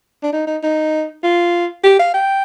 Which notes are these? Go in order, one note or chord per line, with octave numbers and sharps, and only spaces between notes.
D4
D#4
D#4
D#4
F4
G4
F5
G5